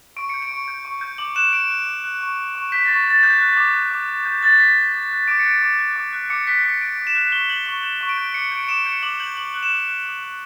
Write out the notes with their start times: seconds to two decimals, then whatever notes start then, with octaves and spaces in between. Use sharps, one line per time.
0.16 C#6 D7
0.29 G6 C#7
0.42 D7
0.51 C#6
0.68 G6
0.85 C#6
1.01 G6
1.18 D6 F#7
1.36 F#6 E7
1.53 D6 D7
1.70 F#6
1.87 D6
2.04 F#6
2.21 C#6
2.38 G6
2.55 C#6
2.72 G6 B6
2.85 C#6 A6
3.06 G6 A6
3.23 D6 G6
3.40 F#6
3.49 A6
3.57 D6
3.75 F#6
3.92 D6
4.08 F#6
4.25 D6 G6
4.42 F#6 A6
4.59 D6 B6
4.76 F#6
4.93 D6
5.11 F#6
5.28 D6 D7
5.39 C#7
5.45 F#6
5.51 D7
5.62 D6
5.79 F#6
5.96 D6
6.12 F#6
6.30 D6 C#7
6.47 F#6 B6
6.64 D6 C#7
6.81 F#6 D7
6.98 D6
7.07 E7
7.15 F#6
7.32 C#6 G7
7.49 G6 F#7
7.66 C#6 F#7
7.83 G6 E7
8.01 C#6
8.09 D7
8.17 G6
8.34 D6 C#7
8.51 G6 D7
8.63 D7
8.68 D6 E7
8.86 G6 C#7
9.02 D6 F#7
9.20 G6 F#7
9.37 D6 F#7
9.54 F#6
9.63 E7
9.71 D6
9.88 F#6
10.05 D6
10.22 F#6